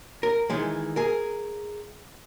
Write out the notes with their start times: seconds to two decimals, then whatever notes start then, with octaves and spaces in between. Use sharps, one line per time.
0.23 A#4
0.50 D#3 E3 G#3
0.96 G#4 A#4